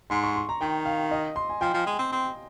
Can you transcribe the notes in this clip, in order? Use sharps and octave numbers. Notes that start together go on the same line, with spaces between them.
G#2 C6
C#6
C6
A#5
D#3 G5
F5
D#5
C6
G#5
F3 G5
F3
G#3
C4
C4